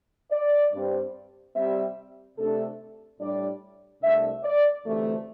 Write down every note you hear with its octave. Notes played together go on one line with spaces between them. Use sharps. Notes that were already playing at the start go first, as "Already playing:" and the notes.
D5
G2 G3 C4
C3 G3 C4 E5
C3 A3 D4 A4
A2 G3 D4 D5
C2 C3 A3 D4 E5
D5
D2 C3 E3 A3